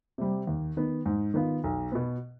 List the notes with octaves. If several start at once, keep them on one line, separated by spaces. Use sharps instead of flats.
C3 G3
D#2
D#3 B3
G#2
D#3 B3 F4
B1
B2 B3